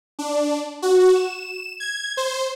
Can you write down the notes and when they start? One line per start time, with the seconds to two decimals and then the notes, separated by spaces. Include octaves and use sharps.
0.19 D4
0.82 F#4
1.15 E7
1.80 G#6
2.17 C5